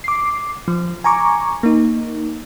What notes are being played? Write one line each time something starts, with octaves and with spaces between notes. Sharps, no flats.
D6 C7
F3
G#5 A#5 C#6 D6
A#3 D#4